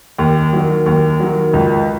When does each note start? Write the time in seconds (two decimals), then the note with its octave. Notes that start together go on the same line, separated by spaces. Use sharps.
0.18 D#2
0.53 D#3 F#3
0.86 D#2
1.20 D#3 F#3
1.54 C#2